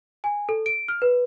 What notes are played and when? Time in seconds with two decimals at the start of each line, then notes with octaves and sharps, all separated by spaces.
0.24 G#5
0.49 A4
0.66 D7
0.88 F6
1.02 B4